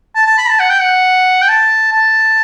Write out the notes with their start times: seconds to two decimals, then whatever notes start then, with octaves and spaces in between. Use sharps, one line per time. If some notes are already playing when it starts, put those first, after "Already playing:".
0.15 A5
0.27 A5
0.38 B5
0.49 A5
0.60 F#5
0.70 G5
0.80 F#5
1.42 G5
1.48 A5
1.93 A5